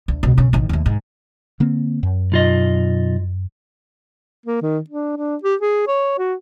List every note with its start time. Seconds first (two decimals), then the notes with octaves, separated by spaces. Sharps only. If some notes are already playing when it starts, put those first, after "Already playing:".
0.08 D2
0.23 C#2 B2
0.37 B1 C#3
0.53 A1 D#3
0.69 D#2 A3
0.86 G#2
1.60 D3 A#3 C4
2.03 F#2
2.32 B1 F4 D#5
4.46 A#3
4.62 D#3
4.90 D4
5.16 D4
5.43 G4
5.61 G#4
5.87 C#5
6.18 F#4